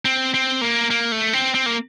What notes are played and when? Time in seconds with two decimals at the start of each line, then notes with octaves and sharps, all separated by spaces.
0.05 C4
0.34 C4
0.61 A#3
0.90 A#3
1.12 A3
1.33 C4
1.54 C4
1.66 A#3